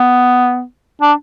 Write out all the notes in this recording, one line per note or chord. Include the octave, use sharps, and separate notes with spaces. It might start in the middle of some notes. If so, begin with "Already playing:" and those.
Already playing: B3
D4